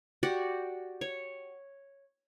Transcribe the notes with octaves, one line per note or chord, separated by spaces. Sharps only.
F#4 G4 D5 F#5
C#5